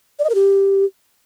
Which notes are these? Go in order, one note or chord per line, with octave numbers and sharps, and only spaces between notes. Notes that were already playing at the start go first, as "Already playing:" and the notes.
D5
D#5
A#4
G4